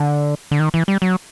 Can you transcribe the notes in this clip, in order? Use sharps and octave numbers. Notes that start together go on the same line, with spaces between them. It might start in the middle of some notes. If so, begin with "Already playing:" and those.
Already playing: D3
D3
D#3
E3
G3
F#3